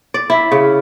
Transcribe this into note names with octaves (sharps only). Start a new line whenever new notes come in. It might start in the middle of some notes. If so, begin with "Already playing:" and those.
D5
E4
C#3